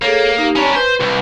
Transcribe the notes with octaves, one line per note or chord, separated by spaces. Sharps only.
A#3 G#4 A4 C#5
D#4 G4
C#4 D4 G#5 A#5 B5
B4 C5
C2